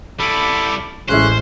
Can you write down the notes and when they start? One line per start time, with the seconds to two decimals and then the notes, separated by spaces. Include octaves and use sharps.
0.19 G3 E4 A4 B5 D6
1.09 A1 C#3 G#3 C#4 E4 C5 C6 F#6